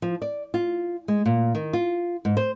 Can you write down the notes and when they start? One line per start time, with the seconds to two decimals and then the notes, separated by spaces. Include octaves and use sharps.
0.02 F3
0.22 D5
0.54 F4
1.08 G#3
1.26 A#2
1.55 D#3
1.73 F4
2.25 G#2
2.37 C5